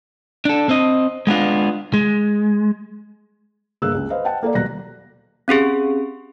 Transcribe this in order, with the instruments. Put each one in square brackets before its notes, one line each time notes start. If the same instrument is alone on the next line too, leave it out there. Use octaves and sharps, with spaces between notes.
[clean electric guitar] D4 A4
C4 D#5
G#3 B3 D4 F4
G#3
[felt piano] G1 A#3 G#4 E6 F#6
C#2
B4 C5 D#5 F5
F#5 G5 A5
A#3 A4 A#4 D5
D#1 B2 F#3 G3 F#6 A#6
[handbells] C4 C#4 G4 G#4